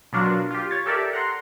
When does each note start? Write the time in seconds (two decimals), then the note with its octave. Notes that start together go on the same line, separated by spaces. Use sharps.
0.13 B2 F#3 D4 F4 F#4 A#4
0.51 F4 G4
0.71 C#5 A6
0.86 G4 A4 A#4 D5 E5
1.13 F#5 A#5 C6